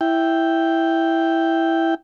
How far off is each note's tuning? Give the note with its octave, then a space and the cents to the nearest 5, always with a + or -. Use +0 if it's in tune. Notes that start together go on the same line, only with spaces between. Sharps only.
E4 +0 G5 +0